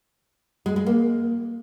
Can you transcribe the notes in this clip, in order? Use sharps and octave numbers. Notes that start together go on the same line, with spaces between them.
G#3
G#3
A#3